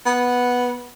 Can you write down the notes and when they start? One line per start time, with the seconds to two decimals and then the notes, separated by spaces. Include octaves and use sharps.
0.06 B3 F#5